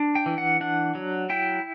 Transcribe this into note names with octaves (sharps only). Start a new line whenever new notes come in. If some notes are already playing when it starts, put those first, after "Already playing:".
Already playing: D4
G5
E3
F#5
D4 F#5
F#3
E4 G5